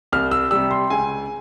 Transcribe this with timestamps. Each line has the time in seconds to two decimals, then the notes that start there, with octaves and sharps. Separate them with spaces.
0.12 C2 F6
0.31 E6
0.51 C3 G3 E6
0.71 C6
0.90 C#2 G#5